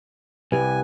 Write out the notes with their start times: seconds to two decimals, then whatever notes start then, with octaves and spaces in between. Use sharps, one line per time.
0.52 C2 G4 B4 G#5